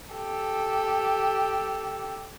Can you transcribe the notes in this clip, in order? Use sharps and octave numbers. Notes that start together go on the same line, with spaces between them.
G4 A4